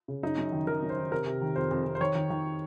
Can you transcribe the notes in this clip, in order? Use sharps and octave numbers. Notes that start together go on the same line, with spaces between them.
C#3
F#2 D#4
F#2
D#3
D#3 A#4
F#2
C5
D#3
C3 A#4
C3
D#3
F2 C5
F2
F2
C5
D#3 C#5
D#3
D#3